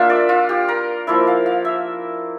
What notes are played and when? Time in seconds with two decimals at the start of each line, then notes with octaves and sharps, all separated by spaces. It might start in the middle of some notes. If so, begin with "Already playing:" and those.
Already playing: A#3 D4 F4 E5
0.09 D5
0.29 F4
0.49 G4
0.68 A#4
1.07 F3 A#3 E4 E5
1.27 F5
1.46 F5
1.65 E5